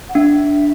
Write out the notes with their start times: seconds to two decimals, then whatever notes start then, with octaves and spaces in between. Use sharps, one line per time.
0.09 F#5
0.15 D4 E5